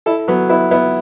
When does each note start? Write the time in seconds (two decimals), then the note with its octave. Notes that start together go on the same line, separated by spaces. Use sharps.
0.06 E4 A4
0.28 F#3 B3
0.49 B3 E4
0.71 B3 E4